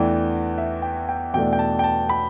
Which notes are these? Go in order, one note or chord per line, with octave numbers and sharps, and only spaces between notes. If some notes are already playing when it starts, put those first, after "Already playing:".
Already playing: E2 E3 A3 D4 G5
E5
G5
G5
E2 B2 A3 D4 G5
G5
A5
G5
A5
B5